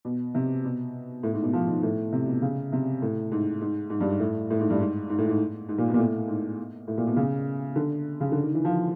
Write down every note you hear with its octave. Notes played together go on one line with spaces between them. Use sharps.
B2
C3
B2
A2
G#2
B2
F3
D#3
A2
C3
B2
C#3
C3
A2
G#2
G#2
G#2
G2
G#2
A2
A2
G#2
G2
G#2
G#2
A2
G#2
G#2
A#2
B2
A#2
A2
G#2
A2
A#2
B2
C#3
D3
C#3
D3
D#3
E3
F3